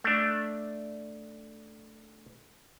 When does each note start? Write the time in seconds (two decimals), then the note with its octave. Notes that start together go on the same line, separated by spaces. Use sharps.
0.04 A3 D4